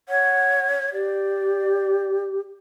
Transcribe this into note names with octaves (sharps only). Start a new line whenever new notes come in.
C#5 F#5
G4 D5